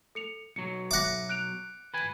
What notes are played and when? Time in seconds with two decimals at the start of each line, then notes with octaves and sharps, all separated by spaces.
0.15 A4 C#7 F7
0.56 B1 F#3 C#7
0.91 E5 F#5 D6 A#6
1.29 F#6 D7 F7
1.94 B4 G#5